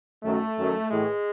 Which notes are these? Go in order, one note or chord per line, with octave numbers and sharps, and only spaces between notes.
F#2 D#3 F#3 A3
F#2 D#3 F#3
A2 E3 G#3